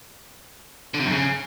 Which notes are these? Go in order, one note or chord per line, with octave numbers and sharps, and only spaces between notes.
D3
C3
F#2
C#3